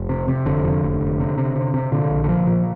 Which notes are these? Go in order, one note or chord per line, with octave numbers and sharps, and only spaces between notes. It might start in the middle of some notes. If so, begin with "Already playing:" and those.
Already playing: F1
C3
C3
F1 D3
F2
F1
F1
C3
C3
C3
C3
A#2 D3
A#1
D3
A#2 F3
A#2